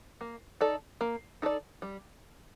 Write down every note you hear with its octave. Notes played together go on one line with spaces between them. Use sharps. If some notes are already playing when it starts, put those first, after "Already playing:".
A#3
D#4 A4 D5
A#3
D#4 A4 D5
G3